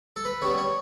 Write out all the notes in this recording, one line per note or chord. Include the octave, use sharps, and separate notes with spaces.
A4
B4
C#3 G3 B3 C#5
C#5